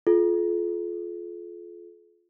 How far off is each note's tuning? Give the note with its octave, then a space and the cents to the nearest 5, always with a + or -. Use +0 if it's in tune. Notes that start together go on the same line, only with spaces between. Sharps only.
F4 +0 A4 -45